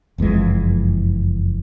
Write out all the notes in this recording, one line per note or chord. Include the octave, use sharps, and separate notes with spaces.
F#1 F2 E3 G#3